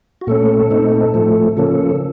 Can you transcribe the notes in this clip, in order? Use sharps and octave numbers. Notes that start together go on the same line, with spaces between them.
F#4
A#2 A3 C#4 A4
A#2 A3 C4 D#4
A2 F3 A3
C#3 F3 A#3 C#4 A4